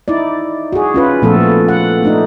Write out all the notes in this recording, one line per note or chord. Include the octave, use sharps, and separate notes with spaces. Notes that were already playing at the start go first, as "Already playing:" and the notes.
D#4 E4 D5
F#4 G#4
C#4 F4 B4
A#2 F3 A3 B3 A4
F#5
A3 D4 D#4